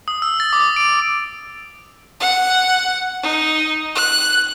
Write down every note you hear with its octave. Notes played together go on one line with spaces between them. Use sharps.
D#6
E6
A6
D6
D7
F#5
D#4
F#6